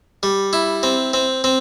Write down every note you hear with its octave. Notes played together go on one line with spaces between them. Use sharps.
G3
E4
C4
C4
C4